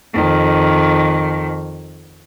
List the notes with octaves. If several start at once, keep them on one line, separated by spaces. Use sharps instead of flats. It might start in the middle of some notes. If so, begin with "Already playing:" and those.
F2 D#3